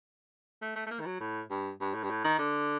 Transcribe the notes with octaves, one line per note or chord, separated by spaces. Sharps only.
A3
A3
A3
A#3
D#3
F#3
A2
G2
G2
A2
G2
A2
D#3
D3